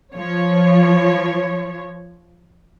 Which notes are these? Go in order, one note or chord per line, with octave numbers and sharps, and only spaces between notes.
F3 C#5